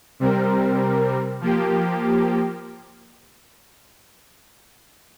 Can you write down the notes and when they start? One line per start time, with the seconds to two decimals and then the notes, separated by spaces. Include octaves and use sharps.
0.20 C3 G3 C4 A#4
1.41 F3 A#3 G4